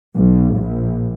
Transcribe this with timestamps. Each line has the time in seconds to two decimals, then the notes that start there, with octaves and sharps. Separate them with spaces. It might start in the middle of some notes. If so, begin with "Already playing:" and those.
0.16 B1
0.55 A#1